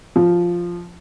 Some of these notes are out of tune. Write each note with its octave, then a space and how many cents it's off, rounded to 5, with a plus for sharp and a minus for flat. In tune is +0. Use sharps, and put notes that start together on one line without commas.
F3 +0